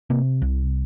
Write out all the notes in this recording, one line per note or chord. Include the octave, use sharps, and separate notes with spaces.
C3 A#3
C2